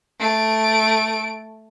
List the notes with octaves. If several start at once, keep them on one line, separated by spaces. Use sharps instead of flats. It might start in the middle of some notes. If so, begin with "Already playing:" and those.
A3 D7